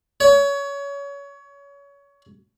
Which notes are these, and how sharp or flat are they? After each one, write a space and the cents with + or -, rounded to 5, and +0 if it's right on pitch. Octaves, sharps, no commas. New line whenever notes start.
C#5 +25